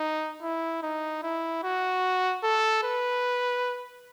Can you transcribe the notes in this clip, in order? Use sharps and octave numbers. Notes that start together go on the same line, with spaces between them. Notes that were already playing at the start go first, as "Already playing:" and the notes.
Already playing: D#4
E4
D#4
E4
F#4
A4
B4